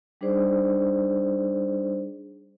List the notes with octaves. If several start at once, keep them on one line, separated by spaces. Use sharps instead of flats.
G3 D4 D#4 G#4 C5 D5